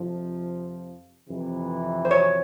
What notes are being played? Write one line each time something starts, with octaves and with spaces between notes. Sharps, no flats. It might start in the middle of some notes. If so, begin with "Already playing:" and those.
Already playing: F2 C3 F3
F2 C3 E3
C5
C#5